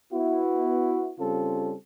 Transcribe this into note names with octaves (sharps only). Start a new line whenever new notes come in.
B3 E4 F#4
C#3 G3 C4 C#4 F4 A4